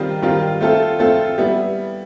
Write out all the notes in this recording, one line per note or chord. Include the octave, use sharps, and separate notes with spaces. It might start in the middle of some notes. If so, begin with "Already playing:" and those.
Already playing: D#3 G3 C4 F4 A#4
D#3 G3 C4 F4 A#4
A3 C4 F4 A4
A3 C4 F4 A4
G3 B3 E4